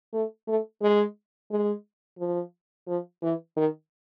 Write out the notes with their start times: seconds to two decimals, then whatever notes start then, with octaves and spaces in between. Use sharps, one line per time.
0.13 A3
0.48 A3
0.82 G#3
1.51 G#3
2.19 F3
2.88 F3
3.22 E3
3.56 D#3